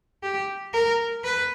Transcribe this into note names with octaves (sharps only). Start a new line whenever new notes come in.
G4
A#4
B4